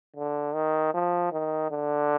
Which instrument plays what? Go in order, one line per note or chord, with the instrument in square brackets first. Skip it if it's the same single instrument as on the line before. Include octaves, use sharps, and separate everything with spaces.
[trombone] D3
D#3
F3
D#3
D3